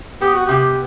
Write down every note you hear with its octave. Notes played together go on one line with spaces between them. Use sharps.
B3 G4
F#4
C3 G4